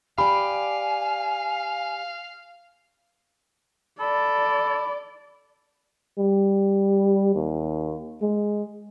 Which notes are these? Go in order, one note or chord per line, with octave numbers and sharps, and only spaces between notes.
G4 D5 F5 G#5 B5
A4 D5 B5
G3
D#2
G#3